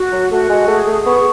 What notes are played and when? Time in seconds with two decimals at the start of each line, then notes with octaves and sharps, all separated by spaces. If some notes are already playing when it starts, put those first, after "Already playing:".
Already playing: F#4
0.12 F#3
0.31 A3 F#4
0.49 G#3
0.68 A3 G#4
0.87 A3
1.06 B3 C#6